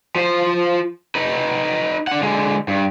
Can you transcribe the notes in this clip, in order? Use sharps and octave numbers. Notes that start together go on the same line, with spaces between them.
F3 C5
D#4 B4
D4 F#5
D3 G#3
G2